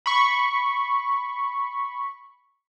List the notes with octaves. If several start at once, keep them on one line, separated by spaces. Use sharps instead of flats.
B5 C#6